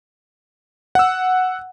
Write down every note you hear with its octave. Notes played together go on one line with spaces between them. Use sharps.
F#5 E6